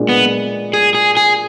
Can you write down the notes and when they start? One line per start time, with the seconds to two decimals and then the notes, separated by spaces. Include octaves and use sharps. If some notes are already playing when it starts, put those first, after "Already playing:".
Already playing: A#2 G#3 D4
0.09 B3
0.74 G#4
0.95 G#4
1.17 G#4